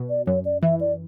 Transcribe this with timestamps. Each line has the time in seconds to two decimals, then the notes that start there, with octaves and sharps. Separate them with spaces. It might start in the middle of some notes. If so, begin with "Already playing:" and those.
Already playing: B2
0.10 D5
0.27 F#2 C#5
0.45 D5
0.63 E3 E5
0.81 D5